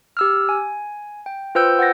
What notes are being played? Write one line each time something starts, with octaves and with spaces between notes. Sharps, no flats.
G4 E6 F6
G#5
G5
F4 B4 C5 G5 E6 G6
F#5 G6 A6 A#6